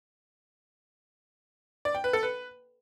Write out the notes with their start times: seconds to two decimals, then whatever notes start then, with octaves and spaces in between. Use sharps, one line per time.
1.85 D5
1.95 G5
2.04 B4
2.13 A4
2.23 B4